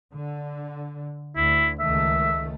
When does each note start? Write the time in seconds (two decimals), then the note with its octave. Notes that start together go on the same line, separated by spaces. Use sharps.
0.14 D3
1.36 D2 E4
1.80 C#2 D#3 A3 E5